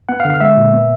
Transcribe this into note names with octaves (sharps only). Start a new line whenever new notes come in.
B3 F#5
F5
D3
F5
G#3 E5
A#2
B3